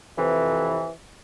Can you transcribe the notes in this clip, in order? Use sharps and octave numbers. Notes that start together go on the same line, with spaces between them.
F2 C3 E3